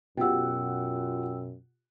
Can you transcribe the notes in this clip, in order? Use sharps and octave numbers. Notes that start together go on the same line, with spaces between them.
F#2 B2 F4 G4 F#5 G5 E6